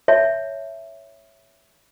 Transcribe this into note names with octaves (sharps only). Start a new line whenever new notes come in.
C#5 E5 A5